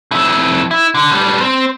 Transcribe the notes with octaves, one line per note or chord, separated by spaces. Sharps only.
F2 E4
E4
D3
A2 G3
C4